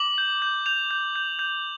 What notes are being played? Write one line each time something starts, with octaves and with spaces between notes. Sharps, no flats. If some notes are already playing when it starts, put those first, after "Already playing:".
Already playing: D6 F#7
G6
G6
G6 F7
G6
G6
G6